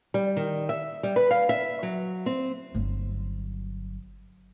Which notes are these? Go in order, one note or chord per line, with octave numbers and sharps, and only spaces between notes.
G3
D#3
E5
G3
B4
F5
E5
F#3
C4
G1 F#3